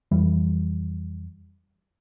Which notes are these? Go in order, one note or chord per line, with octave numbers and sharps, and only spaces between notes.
F2 E3 G3